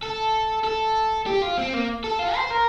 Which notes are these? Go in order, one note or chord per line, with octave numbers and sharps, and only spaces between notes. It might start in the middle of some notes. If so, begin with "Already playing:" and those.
A4
A4
G4
F4
C4
A#3
A4
F4
C5
A#4